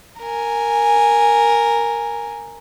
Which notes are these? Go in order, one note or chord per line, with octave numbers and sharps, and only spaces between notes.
A#4 G#5